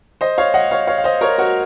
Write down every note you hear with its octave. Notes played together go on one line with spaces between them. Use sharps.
C5 D#5
C#5 F5
D#5 F#5
C#5 F5
C#5 F5
F5
C5 D#5
A#4 C#5
F#4 A#4